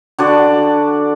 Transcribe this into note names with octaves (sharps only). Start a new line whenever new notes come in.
D3 F#4 D5